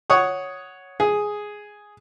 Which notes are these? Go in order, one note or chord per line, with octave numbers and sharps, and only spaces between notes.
C#5 F#5 C#6 D#6
G#4